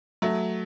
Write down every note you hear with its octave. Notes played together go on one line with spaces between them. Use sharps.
F#3 A3